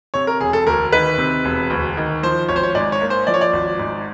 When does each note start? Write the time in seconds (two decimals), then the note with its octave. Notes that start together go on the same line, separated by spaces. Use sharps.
0.14 C3 C#5
0.27 A#4
0.40 E1 G#4
0.53 A4
0.67 D2 A#4
0.93 D#3 B4
1.18 C3
1.45 E1
1.70 D2
1.97 D#3
2.23 F3 C5
2.49 G#1 C#5
2.56 C5
2.63 C#5
2.75 G#2 D5
2.92 C#5
3.02 A#3
3.10 C5
3.27 F3 D5
3.34 C#5
3.41 D5
3.53 G#1
3.79 G#2